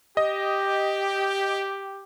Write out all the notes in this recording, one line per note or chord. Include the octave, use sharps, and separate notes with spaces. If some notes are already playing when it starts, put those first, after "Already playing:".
G4 D#5